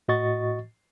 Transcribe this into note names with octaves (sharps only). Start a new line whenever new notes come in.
A2 F#4 D#5 C#6 A6